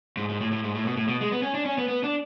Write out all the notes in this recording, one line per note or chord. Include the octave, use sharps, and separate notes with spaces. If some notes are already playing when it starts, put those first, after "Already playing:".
G#2
G#2
A2
A2
G#2
A2
B2
A2
B2
G#3
B3
C#4
D4
C#4
B3
B3
D4